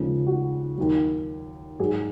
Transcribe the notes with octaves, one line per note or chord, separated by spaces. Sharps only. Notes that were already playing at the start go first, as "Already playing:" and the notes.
Already playing: D#2 C#3 F3 G#3
F#4
D#2 D#3 F#3
G#2 F#3 G#4